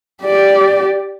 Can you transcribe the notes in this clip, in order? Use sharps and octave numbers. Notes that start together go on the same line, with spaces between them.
G4 D5